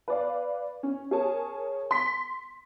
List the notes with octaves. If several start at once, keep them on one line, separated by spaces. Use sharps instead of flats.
B4 D5 F5
C#4
G#4 A#4 C#5 G#5 A5
C6 B6